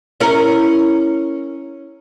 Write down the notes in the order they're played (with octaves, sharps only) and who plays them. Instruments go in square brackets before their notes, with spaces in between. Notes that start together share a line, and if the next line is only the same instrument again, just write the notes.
[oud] C#4 E4 A#4